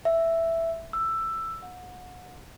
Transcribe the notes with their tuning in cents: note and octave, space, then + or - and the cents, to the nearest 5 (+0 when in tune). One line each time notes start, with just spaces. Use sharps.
E5 +5
E6 +10
F#5 -30